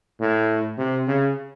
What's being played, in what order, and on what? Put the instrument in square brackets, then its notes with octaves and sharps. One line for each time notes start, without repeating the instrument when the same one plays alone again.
[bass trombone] A2
C3
C#3